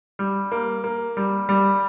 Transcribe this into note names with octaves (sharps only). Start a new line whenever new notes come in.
G3
A#3
A#3
G3
G3